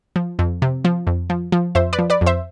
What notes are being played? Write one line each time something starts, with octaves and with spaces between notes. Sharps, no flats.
F3
F2
C3
F3
F2
F3
F3
F2 C5 E5
B4 D5
F3
B4 D5
F2
C5 E5